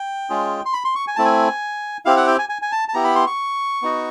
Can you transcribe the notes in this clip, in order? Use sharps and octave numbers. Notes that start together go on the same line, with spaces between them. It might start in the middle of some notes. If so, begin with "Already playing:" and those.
Already playing: G5
G#3 C#4 F4 G#4
C6
B5
C6
C#6
G#5
A3 C4 E4 A5
G#5
C4 E4 G4 F5
F#5
G5
G#5
G#5
G#5
A5
A5
B3 E4 G4 A#5
B5
C6
C#6
B3 D#4 F#4